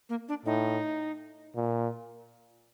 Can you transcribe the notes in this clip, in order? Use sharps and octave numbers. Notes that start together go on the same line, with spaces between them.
A#3
D4
A2 D#4
A#2